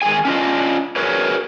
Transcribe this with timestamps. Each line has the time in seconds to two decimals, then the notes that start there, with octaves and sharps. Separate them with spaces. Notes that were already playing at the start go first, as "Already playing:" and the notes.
0.02 D#3 G#3 G#4 G#5
0.25 C#4 D4 F4 D#5
0.96 F#4 G#4 A#4 B4 C#5